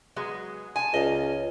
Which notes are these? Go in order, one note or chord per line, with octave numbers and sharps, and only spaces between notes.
F#3 G#3 B3
G#5 A5
C#2 D#5 F5